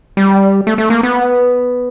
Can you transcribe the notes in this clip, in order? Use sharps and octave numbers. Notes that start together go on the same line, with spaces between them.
G3
A3
A3
A#3
B3